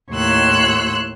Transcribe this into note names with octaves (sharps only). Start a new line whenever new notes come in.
D#2 A2 C#5 C6 E6 F#6